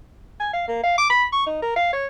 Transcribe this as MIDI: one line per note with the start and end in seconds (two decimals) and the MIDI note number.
0.40 0.51 80
0.53 0.64 77
0.68 0.79 58
0.83 0.94 77
0.98 1.08 86
1.10 1.24 83
1.32 1.45 85
1.46 1.61 63
1.62 1.72 70
1.76 1.92 77
1.93 2.06 73